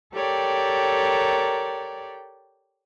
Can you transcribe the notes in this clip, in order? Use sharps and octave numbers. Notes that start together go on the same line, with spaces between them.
G4 A4 A#4 C#5 D5 G5